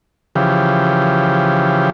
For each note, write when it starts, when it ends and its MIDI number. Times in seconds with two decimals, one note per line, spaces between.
0.35 1.90 49
0.35 1.90 52
0.35 1.90 53
0.35 1.90 67